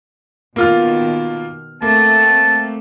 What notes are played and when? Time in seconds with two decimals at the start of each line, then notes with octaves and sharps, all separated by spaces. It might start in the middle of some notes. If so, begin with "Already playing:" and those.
0.56 B2 D#3 A#3 F4 F6
1.82 A3 A#3 C4 A4 A5